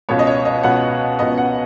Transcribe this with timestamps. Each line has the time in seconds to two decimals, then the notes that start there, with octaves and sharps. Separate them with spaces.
0.09 C#2 B2 B3 C#5
0.19 D#5
0.27 C#5
0.45 D#5
0.63 C#2 B2 B3 F#5
1.19 C#2 B2 B3 D#5
1.38 F#5